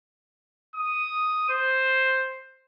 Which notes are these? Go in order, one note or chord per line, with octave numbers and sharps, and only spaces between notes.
D#6
C5